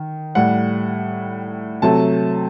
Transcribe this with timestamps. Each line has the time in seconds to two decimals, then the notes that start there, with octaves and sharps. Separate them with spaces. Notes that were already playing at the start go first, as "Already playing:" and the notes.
Already playing: D#3
0.35 A2 G3 F#5
1.82 C3 F#3 A3 A5